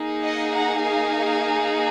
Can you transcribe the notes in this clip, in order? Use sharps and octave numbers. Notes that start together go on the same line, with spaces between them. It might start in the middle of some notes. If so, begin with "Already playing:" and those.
Already playing: A#3 D#4 G#4
D#5 F#5
F#5 A#5
F5 G#5